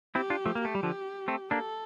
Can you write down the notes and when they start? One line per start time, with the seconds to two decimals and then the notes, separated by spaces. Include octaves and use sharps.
0.15 C4 E4 G4
0.30 D4 F4
0.46 F3 A3
0.55 A#3
0.61 A3 G4
0.75 G3
0.83 D3 F3
1.28 A3 C4
1.51 A#3 D4 A4